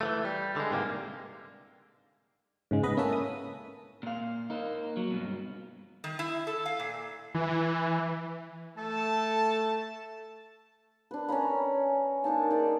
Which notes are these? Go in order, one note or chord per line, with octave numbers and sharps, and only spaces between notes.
E3 F3 A3
G3
D3 G#3
G#2 C3 E3 G3 A#3
G#2 C#3 G#3
B3 B4 D#5 B5
A#3 C#4 E4 A4 E5
D#6
A#2 F5
A#3 D#4
F#3
G2 B2
D#3
E4
A4
F5
A#2
E3
A3 A4 A5
D4 B4
C#4 G#5 A#5 B5
A#3 D4 D#4 A5
D#4 G#4 D5